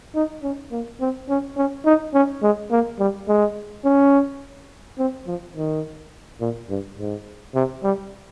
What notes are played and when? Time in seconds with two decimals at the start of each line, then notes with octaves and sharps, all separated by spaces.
0.15 D#4
0.43 C#4
0.72 A#3
1.01 C4
1.29 C#4
1.57 C#4
1.86 D#4
2.14 C#4
2.42 G#3
2.71 A#3
2.99 G3
3.28 G#3
3.85 C#4
4.98 C4
5.27 F3
5.56 D#3
6.41 A#2
6.70 G2
6.98 G#2
7.55 C3
7.83 G3